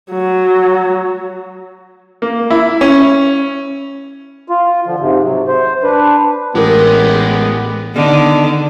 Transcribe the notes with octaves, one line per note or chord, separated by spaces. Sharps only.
F#3
A#3
E4
C#4
F4
D3 F3
G#2 C3
C3 F#3
C5
D4 B4
A1 G#3 B3 F4 G4 A#4
D3 D#3 B3